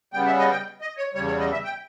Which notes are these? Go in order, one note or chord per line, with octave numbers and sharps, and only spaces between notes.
C#3 G3 B3 G5
E5
D#5
G5
D#5
C#5
E2 C#3 G3 C#5
C#5
D#5
E5
G5